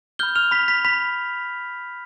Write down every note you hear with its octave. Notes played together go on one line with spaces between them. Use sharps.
B5 F6 G6 G7
F6 F7
B5 B6
B5 B6
B5 B6